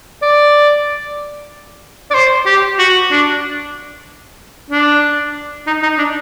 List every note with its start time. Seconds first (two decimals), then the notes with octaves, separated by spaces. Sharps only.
0.22 D5
2.11 D5
2.14 C5
2.46 G4
2.79 F#4
3.11 D4
4.71 D4
5.67 D#4
5.83 D#4
5.98 D4